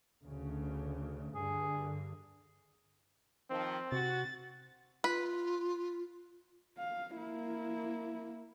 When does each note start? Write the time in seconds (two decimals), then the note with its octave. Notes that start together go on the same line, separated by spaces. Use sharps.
0.23 D2 C#3
1.35 G2 D3 G#4
3.50 D#3 F3 C4
3.92 C3 F#4 A6
5.04 F4 B4
6.79 F5
7.16 A#3 E4